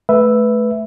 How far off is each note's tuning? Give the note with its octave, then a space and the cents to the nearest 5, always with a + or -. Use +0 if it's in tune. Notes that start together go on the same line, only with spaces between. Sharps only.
A3 -20 B4 +0 E5 +0